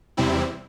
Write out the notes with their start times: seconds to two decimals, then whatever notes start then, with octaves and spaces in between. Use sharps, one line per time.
0.17 E2 C3 G3 C4 E4